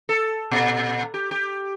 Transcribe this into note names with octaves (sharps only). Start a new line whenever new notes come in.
A4
A#2
G4
G4